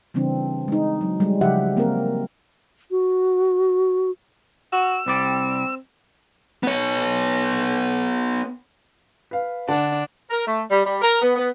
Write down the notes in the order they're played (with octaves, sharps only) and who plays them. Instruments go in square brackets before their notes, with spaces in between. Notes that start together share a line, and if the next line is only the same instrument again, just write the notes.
[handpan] C#3 E3 G3 C4 D4
G#3 D#4
F#3
G3 G#3
C#3 F3 F#3 G4 E5 F#5
A#3 C4 A#4
[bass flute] F#4
[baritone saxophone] F#4 [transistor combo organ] E6
[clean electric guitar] C2 G3 D5 [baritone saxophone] C4
[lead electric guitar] B3 C#5
[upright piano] B4 F5
[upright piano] D3 F#5 A5 [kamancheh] D4
[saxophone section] A#4
A3
G3
G3
A#4
B3
B3